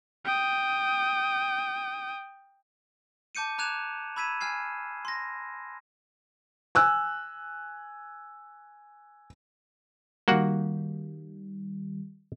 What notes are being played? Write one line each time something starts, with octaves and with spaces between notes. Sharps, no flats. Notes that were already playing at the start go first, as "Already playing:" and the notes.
G5 D#6
A5 D6 G6 C#7 D#7
A#5 D6 F#6 G#6 E7 F7
B5 E6 G#6 B6 D#7 E7
G#5 F6 G#6 C7
C6 A#6
G#5 E6 F#6
D#3 G3 A#3 F#4 F#5